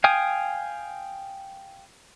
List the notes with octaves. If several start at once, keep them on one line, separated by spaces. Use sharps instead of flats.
F5 G5 G#5 D#6